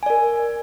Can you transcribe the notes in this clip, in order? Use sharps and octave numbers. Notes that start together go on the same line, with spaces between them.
A#4 D5 G#5